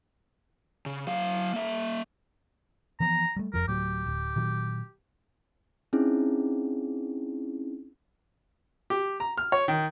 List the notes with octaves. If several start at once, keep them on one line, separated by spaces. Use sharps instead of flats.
C#3
F#3 F5
A#3 E5
E3 F3 B3 A#5
G3 A3
F1 F2 F3 A#4
D1 A2 F#3 G4
D1
A#2 D#3 F#3
C4 C#4 D#4 E4 G#4
G4
A#5
F6
C#5
D#3